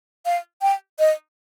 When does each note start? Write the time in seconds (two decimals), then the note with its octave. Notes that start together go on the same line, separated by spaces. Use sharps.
0.26 F5
0.62 G5
0.99 D#5